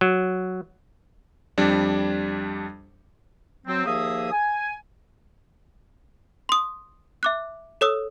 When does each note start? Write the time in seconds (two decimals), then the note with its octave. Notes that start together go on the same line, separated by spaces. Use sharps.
0.01 F#3
1.58 F2 G3 D4
3.66 F#3 C4
3.85 D#2 F3 A#3 G#4 E5 D#6
4.32 G#5
6.49 C6 D#6
7.23 E5 D6 F#6
7.81 A4 C#5 D#6 E6